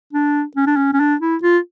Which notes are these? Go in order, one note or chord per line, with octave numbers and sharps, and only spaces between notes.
D4
C#4
D4
C#4
C#4
D4
E4
F4